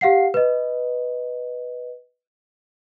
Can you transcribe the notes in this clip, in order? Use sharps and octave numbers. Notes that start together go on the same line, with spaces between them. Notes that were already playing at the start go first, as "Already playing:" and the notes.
G4 F5 F#5 C7
B4 D#5